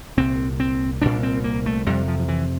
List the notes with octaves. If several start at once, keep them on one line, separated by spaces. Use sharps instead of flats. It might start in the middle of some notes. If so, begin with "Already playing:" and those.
C2 A#2 C4
C4
C2 A#2 D4
C4
A#3
A3
F2 C3 G3
F3
F3
E3